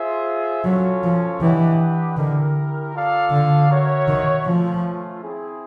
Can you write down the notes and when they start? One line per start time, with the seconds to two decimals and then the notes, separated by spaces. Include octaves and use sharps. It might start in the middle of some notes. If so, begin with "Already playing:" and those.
Already playing: F4 G#4 C5 E5
0.65 F#3 C#4 F4 A4 C#5
1.04 F3
1.41 E3 D4 G4 B4 D#5 F#5
2.17 D3 E4 G4 A#4
2.94 F4 A4 D5 F5
3.31 D3
3.69 F#4 A#4 C#5 E5
4.08 D#3
4.46 F3 A3 C#4 F4
5.22 C4 E4 G#4